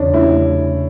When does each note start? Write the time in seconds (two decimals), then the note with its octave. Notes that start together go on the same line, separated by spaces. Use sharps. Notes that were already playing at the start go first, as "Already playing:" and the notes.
Already playing: E2 C#3 C#4 D4
0.13 A3 E4